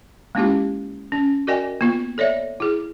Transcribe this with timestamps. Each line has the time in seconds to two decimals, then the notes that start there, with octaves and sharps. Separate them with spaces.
0.35 G#3 A#3 C#4 E4 F4 G4
1.12 C#4
1.47 F#4 A#4 D5 D#5 G5 G#5
1.81 A#3 B3 F4
2.18 A4 C#5 D5 E5
2.60 E4 G#4